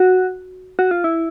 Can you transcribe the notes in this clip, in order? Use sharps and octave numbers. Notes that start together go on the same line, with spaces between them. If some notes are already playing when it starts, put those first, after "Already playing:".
Already playing: F#4
F#4
F4
E4